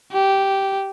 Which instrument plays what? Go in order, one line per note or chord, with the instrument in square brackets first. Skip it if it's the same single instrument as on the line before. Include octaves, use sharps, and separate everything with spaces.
[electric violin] G4